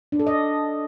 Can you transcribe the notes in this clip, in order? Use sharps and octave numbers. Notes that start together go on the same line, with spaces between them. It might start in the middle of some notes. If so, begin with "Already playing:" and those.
D4
A4
D#5